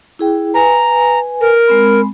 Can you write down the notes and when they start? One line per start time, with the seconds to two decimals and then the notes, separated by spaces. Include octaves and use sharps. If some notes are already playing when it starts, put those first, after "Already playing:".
0.19 E4 G#4 G5
0.54 B4 G#5 A#5
1.41 A#4
1.68 G#3 C4 B5